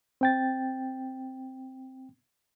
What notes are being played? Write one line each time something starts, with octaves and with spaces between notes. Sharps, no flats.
C4 G5 A6